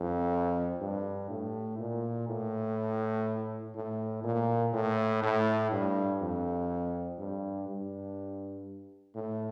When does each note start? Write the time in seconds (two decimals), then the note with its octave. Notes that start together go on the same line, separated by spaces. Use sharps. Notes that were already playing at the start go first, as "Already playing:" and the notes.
Already playing: F2
0.81 G2
1.30 A2
1.79 A#2
2.28 A2
3.75 A2
4.24 A#2
4.74 A2
5.23 A2
5.72 G2
6.21 F2
7.19 G2
7.68 G2
9.15 A2